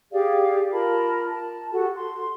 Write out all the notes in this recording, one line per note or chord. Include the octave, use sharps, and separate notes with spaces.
G4 G#4 D5 F5
F4 A#4 A5 B5
A5
F#4 G4 A4 F#5
C6